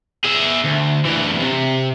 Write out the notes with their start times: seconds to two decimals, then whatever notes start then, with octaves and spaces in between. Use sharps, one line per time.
0.25 G#4 E5
0.64 D2
1.05 D2 E3
1.41 C3